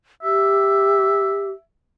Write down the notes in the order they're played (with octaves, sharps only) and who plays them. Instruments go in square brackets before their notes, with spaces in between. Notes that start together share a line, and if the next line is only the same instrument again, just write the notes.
[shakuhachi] G4 [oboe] E5